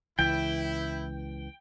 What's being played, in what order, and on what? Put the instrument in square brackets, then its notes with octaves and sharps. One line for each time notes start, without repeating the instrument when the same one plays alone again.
[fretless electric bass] C#2 E3 [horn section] E4 [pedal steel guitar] G5